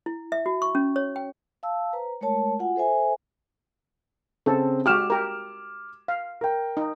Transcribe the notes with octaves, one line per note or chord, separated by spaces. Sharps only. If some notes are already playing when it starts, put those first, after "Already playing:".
E4
E5
F#4
C#6
C#4
C#5
G5
F5 A5 E6
B4 C5 A#5
G#3 A3 A#4 C#5 A5
F4 F#4 F#5 G#5
A4 C5 E5 G#5
C#3 C4 A4
G#3 F#4 G4 D6 F6 E7
G4 A#4
F5
A#4 G5
D#4